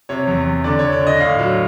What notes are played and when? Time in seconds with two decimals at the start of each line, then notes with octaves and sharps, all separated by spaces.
0.09 C3 C#5
0.27 E2
0.46 E2
0.64 D3 D5
0.79 D3 C#5
0.92 D5
1.01 D3
1.07 D#5
1.20 A2 F5
1.39 F#3